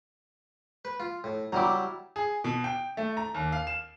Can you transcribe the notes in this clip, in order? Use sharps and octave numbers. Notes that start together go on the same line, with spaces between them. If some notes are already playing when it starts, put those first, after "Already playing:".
B4
F4
A2
F#3 G3 E4 A#5 D6
G#4
B2
G5
A3
A#5
D#2
F5
E7